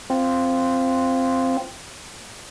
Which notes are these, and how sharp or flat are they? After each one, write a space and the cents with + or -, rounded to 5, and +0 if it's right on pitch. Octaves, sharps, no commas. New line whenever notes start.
C4 +0 F4 -5